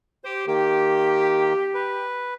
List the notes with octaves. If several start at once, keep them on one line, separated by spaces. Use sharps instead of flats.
G4 C5
D#3 A#3 G4
B4